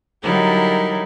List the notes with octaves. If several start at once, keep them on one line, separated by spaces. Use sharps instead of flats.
D3 F#3 G3 D#4 E4 A#4